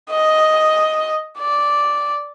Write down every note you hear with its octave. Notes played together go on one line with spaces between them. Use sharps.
D#5
D5